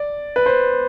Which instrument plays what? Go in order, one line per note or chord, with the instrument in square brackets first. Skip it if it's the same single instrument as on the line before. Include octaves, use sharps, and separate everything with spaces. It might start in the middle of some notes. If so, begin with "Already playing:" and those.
Already playing: [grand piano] D5
B4
C5